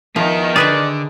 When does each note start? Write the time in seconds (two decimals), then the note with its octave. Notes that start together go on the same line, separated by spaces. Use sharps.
0.16 D#3 F3 B3 E5
0.56 D3 G#4 B4 D5 E5